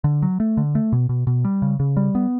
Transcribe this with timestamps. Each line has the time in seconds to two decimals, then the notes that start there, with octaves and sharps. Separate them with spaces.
0.04 D3
0.22 F#3
0.40 A3
0.57 D3
0.75 A3
0.93 B2
1.09 B2
1.27 B2
1.45 G3
1.62 C#3
1.80 C#3
1.97 G3
2.15 B3